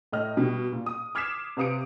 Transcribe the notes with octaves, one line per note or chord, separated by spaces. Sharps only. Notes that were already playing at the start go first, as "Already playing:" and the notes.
A2 D#5 F6
B2 G3
A#2
D#6
D6 F6 G#6 B6 C7 E7
C3 B4 F5 D#6 C#7 D7